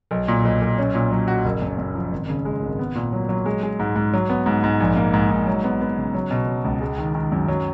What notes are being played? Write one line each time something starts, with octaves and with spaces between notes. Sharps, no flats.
B1
A#2
B1
B1
C#4
A#2
F#3
F#4
F#1
F#2
F#2
F3
G#1
C#3
G#3
G#1
B3
A#2
F#3
F#3
G#3
G#3
G#2
G#2
F#3
B3
G#2
G#2
A#1
A#3
G#2
G#2
F#3
B3
B3
C#3
F#3
B2
F#3
C#2
G#3
D#3
D#3
F#2
F#3